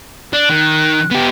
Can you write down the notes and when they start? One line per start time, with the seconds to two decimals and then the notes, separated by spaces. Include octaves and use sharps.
0.33 D4 F#6
0.50 D#3
1.11 B3 G4